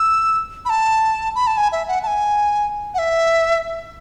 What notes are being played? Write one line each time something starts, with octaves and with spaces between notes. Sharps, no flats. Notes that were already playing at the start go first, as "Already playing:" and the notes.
Already playing: E6
B5
A5
B5
A5
G#5
E5
F#5
A5
G#5
F#5
E5